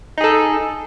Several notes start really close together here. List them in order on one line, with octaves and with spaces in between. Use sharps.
D#4 G#4 A4